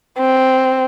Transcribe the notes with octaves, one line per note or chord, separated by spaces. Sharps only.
C4